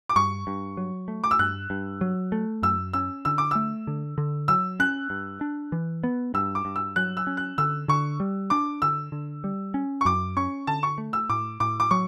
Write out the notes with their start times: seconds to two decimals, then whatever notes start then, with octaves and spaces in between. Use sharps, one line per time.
0.09 D6
0.16 G2 C#6
0.47 G2
0.77 F#3
1.08 A3
1.24 D6
1.31 E6
1.39 G2 F#6
1.70 G2
2.01 F#3
2.32 A3
2.63 F#2 E6
2.93 C#4 E6
3.25 D3 E6
3.38 D6
3.51 A3 E6
3.87 D3
4.18 D3
4.48 F#3 E6
4.80 C#4 F#6
5.10 G2
5.41 D4
5.72 E3
6.04 B3
6.34 G2 E6
6.55 D6
6.65 G2
6.76 E6
6.96 F#3 F#6
7.17 E6
7.27 C#4
7.37 F#6
7.58 D3 E6
7.88 D3 C#6
8.20 G3
8.50 D4 D6
8.82 D3 E6
9.12 D3
9.44 G3
9.74 C#4
10.01 C#6
10.05 F#2 D6
10.37 C#4 C#6
10.67 D3 A5
10.83 C#6
10.98 A3
11.13 E6
11.29 A2 D6
11.60 A2 D6
11.80 D6
11.91 F#3 C#6